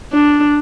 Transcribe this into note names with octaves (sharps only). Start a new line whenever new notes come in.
D4